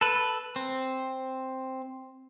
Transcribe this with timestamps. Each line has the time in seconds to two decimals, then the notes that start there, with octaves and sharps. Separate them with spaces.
0.01 A4 B4
0.56 C4